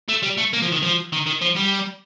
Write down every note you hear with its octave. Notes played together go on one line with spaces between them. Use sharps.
A3
G3
A3
A#3
F3
D#3
F3
D#3
D#3
F3
G3